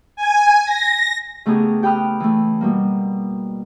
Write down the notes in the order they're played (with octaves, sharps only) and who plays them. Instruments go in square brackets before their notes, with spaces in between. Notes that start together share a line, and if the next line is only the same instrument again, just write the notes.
[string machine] G#5
A#6
[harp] C#3 A3 B3 D#4 G4 G#4
G4 G5 B5 D#6 F6 F#6
E3 A3
B2 G3 A#3